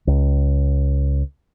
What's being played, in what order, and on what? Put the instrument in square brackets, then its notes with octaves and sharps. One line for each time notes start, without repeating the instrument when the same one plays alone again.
[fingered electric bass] C#2